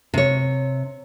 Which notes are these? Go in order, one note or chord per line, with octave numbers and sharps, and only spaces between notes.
C3 C#5